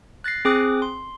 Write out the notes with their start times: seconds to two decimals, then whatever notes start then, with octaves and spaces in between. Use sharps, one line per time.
0.24 F#6 A6 A#6 C7
0.45 C4 G#4 G#5 D6 D#6 F#6
0.82 C6